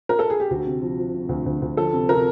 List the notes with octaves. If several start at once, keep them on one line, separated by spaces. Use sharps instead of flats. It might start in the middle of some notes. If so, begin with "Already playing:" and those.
A#4
A4
G#4
G4
D2 F#4
C3
F3
F3
C3
D2
D2
D2
F3 A4
C3
C3 A#4